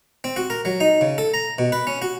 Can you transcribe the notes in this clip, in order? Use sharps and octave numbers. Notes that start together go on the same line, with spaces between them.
C4
F#4
A#4
F#3
D#4
C#3
A4
A#5
B2
B4
C#4
F#4